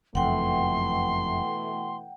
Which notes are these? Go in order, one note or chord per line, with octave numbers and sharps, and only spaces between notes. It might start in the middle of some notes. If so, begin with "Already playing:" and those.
F#1 F2 B2 E3 A3 F#5 G5 C6